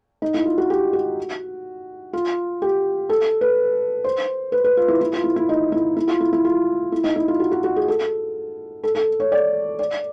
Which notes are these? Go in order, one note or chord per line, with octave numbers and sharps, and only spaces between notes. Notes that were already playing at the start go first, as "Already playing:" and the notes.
D#4
E4
F4
F#4
G4
F#4
F4
G4
A4
B4
C5
B4
B4
F4
E4
E4
F4
E4
E4
D#4
E4
E4
F4
E4
E4
F4
E4
D#4
E4
F4
F#4
F#4
F#4
G#4
A4
A4
A4
C#5
D5
D5